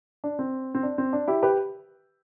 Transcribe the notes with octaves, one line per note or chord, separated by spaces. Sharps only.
D4
C4
C4
D4
C4
D4
E4 G4
G4 B4